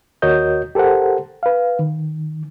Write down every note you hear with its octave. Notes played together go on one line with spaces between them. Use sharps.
D#2 F#4 A#4 C#5 D#5 G6
G4 A4 A#4 C5 F#5
B4 F5
D#3